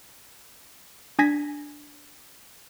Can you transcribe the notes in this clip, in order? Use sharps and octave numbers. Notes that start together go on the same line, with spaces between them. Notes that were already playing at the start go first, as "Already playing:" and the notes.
D4 G#5 G#6 A#6 B6